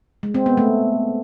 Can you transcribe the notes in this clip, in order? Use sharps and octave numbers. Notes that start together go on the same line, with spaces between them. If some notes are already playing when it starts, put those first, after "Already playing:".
G#3
C4
B3
A3